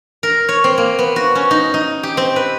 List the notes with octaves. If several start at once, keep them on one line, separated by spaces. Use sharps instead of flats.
A#4
C#5
C4
A#3
B3
F#4
C#4
D#4
D#4
G4
C4
B4